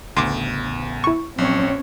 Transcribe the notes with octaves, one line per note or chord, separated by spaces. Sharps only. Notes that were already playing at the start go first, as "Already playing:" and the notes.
A1 D2 C#3 B3 C6 D6
E4 C#6
A#1 F#3 C4 C#4 C#5